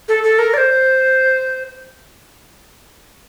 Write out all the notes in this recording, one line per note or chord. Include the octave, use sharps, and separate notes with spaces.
A4
A4
A#4
D5
C5